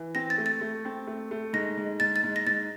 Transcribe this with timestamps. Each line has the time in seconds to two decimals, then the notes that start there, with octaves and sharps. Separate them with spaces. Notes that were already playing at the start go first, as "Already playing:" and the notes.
Already playing: E3
0.15 C4 A#6
0.30 A6
0.38 A3
0.46 A6
0.61 A3
0.85 C4
1.07 A3
1.31 A3
1.53 G#2 A#6
1.77 G#2
2.00 G#2 A6
2.16 A6
2.23 G#2
2.36 A#6
2.46 G#2 A6